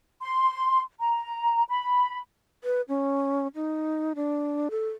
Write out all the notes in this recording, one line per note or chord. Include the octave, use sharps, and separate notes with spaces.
C6
A#5
B5
B4
C#4
D#4
D4
A4